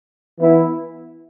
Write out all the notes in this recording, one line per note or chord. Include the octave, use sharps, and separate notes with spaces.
E3 B3 E4